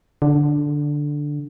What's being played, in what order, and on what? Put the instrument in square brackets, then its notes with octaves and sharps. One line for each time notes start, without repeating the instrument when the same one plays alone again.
[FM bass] D3